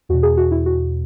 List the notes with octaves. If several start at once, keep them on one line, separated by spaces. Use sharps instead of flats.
E2 B2 F#4
G#4
F#4
E4
F#4